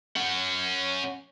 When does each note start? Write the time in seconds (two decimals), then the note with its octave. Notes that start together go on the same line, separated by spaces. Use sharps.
0.16 C#4 F#5